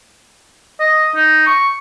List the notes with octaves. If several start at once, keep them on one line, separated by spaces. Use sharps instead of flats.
D#5
D#4
C#6